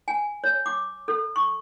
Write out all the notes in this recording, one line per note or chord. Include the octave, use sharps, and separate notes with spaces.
G#5
C#5
D6
A4
C#6